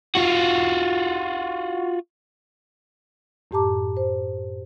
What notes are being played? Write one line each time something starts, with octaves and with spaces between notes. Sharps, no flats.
F4 F#4
F#2 A2 G4 A5 A#5 D6
C5